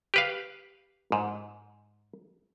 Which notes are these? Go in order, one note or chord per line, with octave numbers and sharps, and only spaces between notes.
G4 B4 F5
G#2